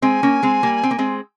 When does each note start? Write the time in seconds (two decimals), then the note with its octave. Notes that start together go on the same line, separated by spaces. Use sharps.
0.02 G#3 C4 G#5
0.23 A#3 C#4
0.43 G#3 C4
0.63 G3 A#3
0.83 C4
0.91 A#3
0.99 G#3 C4